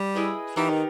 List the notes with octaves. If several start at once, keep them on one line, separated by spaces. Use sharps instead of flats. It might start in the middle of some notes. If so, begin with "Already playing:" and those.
Already playing: G3
E4 G#4 B4 D#5
E3 B3 D#4 G4 A#4
D#3